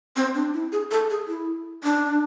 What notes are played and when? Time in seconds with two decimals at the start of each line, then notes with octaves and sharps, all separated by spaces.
0.16 C4
0.35 D4
0.53 E4
0.72 G#4
0.91 A4
1.10 G#4
1.28 E4
1.84 D4